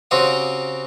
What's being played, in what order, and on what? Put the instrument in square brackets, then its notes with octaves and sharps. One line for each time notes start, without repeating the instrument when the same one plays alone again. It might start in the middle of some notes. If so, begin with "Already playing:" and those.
[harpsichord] C#3 C4 F#4 G4 F5 D#6